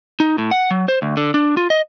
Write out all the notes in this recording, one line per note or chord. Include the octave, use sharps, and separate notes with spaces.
D#4
A2
F#5
F#3
C5
D2
D3
D4
F4
D#5